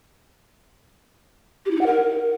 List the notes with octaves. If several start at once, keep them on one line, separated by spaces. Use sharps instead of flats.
G4
E4
D#4
F#5
A#4